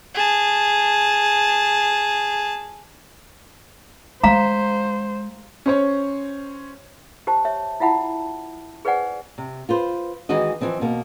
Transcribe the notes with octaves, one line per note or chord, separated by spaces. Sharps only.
G#4 A5
G#3 C5 F5 A#5
C#4 C5 C#5
G4 C5 A5
C#5 E5
E4 F4 E5 F#5 A5 B5
G#4 B4 C5 D5 F#5 G#5
C3
F4 B4 C5
D#3 E3 G#3 F#4 D#5
E3 F3 C4 D#5
B2 A#3